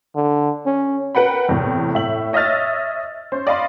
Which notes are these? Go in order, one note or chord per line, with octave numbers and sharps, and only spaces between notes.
D3
C#4
A#4 B4 F#5 G5 B5
E2 A2 C3
A2 E5 F#7
C#5 D#5 E5 E6 F6 A6
C#4 C5
D5 D#5 F5 B5 C6